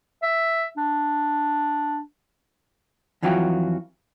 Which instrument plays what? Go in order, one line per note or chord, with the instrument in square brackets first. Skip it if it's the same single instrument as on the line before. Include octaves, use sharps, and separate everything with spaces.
[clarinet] E5
D4
[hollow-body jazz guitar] F2 E3 F#3 F4 F#4 G5